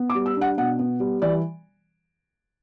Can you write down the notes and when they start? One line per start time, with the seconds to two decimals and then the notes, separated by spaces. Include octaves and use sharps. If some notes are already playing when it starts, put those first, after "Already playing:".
Already playing: B3
0.10 D6
0.15 G3
0.26 E6
0.37 D4 F#5
0.57 B2 F#5
0.79 B3
1.00 G3
1.22 E3 D5